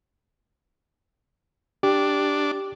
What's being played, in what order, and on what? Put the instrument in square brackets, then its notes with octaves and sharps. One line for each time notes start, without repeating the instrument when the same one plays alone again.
[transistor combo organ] D4 [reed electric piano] G4